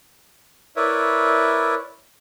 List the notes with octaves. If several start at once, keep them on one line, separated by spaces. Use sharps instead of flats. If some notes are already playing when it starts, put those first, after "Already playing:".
E4 A#4 B4 C#5 D5 E5